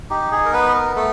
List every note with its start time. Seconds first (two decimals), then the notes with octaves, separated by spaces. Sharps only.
0.10 D#4 G4
0.32 G#4
0.46 A#4
0.52 B3 B4
0.74 A#4
0.96 A3 A4